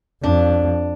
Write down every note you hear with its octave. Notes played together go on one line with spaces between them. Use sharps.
F2 D4